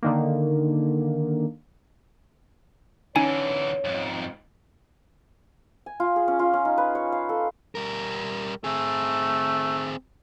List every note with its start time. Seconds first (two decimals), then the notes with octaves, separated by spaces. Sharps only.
0.03 D3 D#3 A#3
3.16 D3 E3 C#4 D#4 C#5 G#5
3.85 F2 G#2
5.86 G#5
6.00 F4
6.16 G#4
6.28 C#4
6.39 F4
6.53 C#4
6.65 D#4
6.78 B4
6.95 C#5
7.12 F5
7.29 A4
7.75 G3 A#4
8.64 A3 C4 G#4